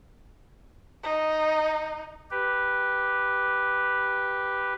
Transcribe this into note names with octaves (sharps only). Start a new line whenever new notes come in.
D#4
G4 B4